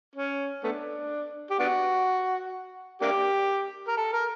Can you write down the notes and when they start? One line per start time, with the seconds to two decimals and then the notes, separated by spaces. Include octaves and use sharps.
0.16 C#4
0.63 A3 B3 D4
1.50 G4
1.59 B3 D4 F#4
3.02 A#3 D4 G4
3.88 A#4
3.97 A4
4.13 A#4